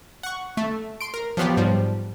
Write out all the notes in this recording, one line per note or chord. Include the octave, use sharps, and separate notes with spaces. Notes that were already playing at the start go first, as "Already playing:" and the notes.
F#5 C#6
A3
C6 D7
A#4
F3 F#3 B3 F4 G4
G#2 F3 G3